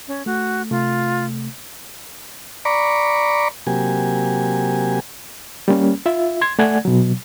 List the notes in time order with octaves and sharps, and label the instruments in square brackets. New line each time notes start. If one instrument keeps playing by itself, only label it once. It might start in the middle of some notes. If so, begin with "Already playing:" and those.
[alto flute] C#4
[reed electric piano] A3 [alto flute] F#4
[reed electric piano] C3 A3 [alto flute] F4
[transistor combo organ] D5 A#5 B5 C#6 D6
C3 F#3 A#3 G4 G#5
[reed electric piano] G3 A#3 C#4
F4 E5
C6 G#6
A3 D5 F#5 G#5 G#6
B2 F#3